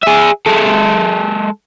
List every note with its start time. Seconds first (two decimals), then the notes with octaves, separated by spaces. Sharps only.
0.03 G#4 E5
0.46 G#3 A4